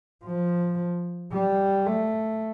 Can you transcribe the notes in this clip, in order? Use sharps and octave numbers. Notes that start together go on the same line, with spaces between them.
F3
G3
A3